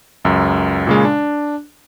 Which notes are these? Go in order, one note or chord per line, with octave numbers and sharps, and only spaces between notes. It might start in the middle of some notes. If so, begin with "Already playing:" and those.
C#2 F#2
A#2 C#3 G#3
D4